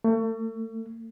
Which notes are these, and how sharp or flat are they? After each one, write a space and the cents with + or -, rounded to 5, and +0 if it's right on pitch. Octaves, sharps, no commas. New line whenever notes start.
A3 +40